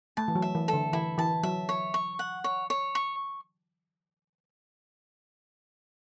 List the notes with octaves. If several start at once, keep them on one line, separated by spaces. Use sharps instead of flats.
A3 A5
E3
F#3
E5
E3
A4
D3
E3 E4
E3 A5
F#3 E5
C#5
C#6
F#5
C#5
C#5
C#6